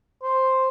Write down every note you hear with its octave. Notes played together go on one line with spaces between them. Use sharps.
C5